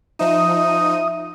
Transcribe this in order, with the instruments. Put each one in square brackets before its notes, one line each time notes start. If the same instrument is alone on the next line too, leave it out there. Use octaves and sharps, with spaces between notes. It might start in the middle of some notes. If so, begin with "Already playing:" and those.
[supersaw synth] F3 D#4 [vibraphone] E5 [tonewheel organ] D#6